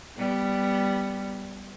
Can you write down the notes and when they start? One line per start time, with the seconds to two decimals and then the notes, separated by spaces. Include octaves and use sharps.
0.17 G3 B3